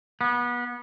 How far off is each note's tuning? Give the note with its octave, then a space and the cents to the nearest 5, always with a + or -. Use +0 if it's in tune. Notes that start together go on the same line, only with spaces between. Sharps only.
B3 -25